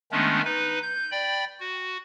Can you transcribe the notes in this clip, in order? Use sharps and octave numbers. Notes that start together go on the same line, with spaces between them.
D#3 G#3 A3 B3 C#4 D4
D#4 B4
G6
D5 G5 B5
F#4